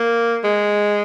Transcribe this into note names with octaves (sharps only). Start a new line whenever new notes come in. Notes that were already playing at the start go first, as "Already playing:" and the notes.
Already playing: A#3
G#3